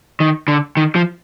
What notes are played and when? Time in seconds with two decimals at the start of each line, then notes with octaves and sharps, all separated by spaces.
0.20 D#3
0.48 D3
0.77 D#3
0.95 F3